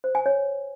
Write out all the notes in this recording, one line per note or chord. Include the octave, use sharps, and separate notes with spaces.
C5
G#5
C#5